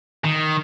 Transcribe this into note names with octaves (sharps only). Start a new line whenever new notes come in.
D#3